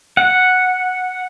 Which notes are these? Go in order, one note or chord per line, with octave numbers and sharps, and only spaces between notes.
F#5